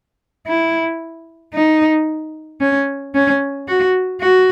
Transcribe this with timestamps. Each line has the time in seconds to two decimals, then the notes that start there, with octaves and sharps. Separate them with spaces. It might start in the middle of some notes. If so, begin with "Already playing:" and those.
0.47 E4
1.53 D#4
2.60 C#4
3.15 C#4
3.68 F#4
4.21 F#4